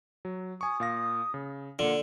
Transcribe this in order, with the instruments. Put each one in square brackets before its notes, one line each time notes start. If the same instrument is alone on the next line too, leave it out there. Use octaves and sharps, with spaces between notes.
[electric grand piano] F#3
[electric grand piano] G#5 C#6 [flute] D#6
[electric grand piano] A#2 F5 A#6
C#3
[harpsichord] D3 [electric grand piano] A#3 F4 [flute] F#5